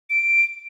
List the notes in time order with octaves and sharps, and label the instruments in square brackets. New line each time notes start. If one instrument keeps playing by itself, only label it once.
[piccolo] D7